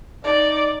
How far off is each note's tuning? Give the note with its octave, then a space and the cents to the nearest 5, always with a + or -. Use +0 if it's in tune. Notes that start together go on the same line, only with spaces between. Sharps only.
D#4 +0 D5 +0